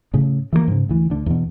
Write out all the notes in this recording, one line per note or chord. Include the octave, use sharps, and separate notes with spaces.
A2 C#3
E3 F3 G3 A#3
G#2 C#3
D2 E3
D2 D3
E2 B2